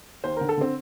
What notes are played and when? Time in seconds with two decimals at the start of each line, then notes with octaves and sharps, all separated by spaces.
0.24 D#2 C5
0.37 D3 A#4
0.49 A4
0.57 D3 C4